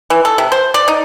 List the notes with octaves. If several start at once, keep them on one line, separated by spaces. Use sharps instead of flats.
E3
A4
C3
C5
D5
D#4